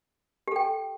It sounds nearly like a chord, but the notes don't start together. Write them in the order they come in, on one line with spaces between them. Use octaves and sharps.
G4 A4 G5